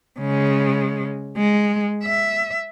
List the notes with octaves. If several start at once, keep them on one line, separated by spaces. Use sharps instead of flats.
C#3 G#3
G#3
E5